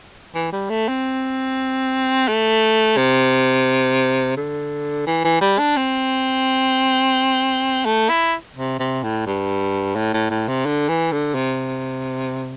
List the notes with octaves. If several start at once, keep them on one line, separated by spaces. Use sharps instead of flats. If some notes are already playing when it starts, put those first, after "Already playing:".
E3
G3
A3
C4
A3
C3
D3
E3
E3
G3
D4
C4
A3
E4
C3
C3
A2
G2
A2
A2
A2
C3
D3
E3
D3
C3